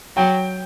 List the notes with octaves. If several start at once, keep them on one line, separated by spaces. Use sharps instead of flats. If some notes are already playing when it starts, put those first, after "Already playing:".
F#3 G5